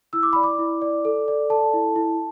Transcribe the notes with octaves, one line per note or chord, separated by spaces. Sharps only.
E4 E6
D6
D5 B5
D6
E4
D5
A4
D5
A4 A5
E4
E4